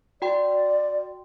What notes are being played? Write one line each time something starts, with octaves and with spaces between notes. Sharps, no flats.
F#4 D5 G5 C6